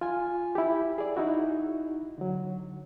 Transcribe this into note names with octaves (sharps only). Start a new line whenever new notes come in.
F4 G#5
E4 G4
G#4 D5
D#4 E4 F#4
D3 F#3